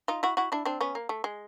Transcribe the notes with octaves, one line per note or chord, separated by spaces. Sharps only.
D#4 F4
E4 F#4
E4 F#4
D4 E4
C4 D4
B3 C#4
A#3
A3
G#3